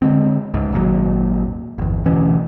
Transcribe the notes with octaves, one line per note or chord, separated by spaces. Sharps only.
D3 F#3 G#3 C4
C#2 G#2
G#1 D#2 A#2 F#3
G1 E2
D2 B2 E3 C#4